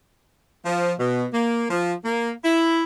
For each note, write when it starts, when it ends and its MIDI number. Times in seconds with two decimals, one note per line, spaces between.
0.65 0.91 53
0.99 1.23 47
1.33 1.65 58
1.70 1.93 53
2.04 2.31 58
2.44 2.84 64